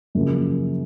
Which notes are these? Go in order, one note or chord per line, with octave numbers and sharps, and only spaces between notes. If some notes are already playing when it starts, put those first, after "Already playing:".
F#2 C#3 F3 A#3